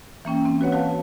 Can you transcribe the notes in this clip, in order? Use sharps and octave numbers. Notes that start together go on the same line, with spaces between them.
E3 A#3 C#4 G5
C4
F#4 B4 C#5 F#5
F#4 B4 F5 A5